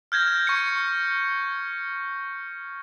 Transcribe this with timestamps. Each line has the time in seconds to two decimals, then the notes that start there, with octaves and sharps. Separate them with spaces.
0.12 F6 G6 G#6 A#6
0.47 C#6 C#7